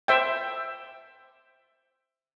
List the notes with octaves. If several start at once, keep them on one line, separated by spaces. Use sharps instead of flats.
C5 E5 G5